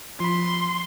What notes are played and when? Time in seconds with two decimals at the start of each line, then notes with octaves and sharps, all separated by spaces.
0.20 F3 B5 C6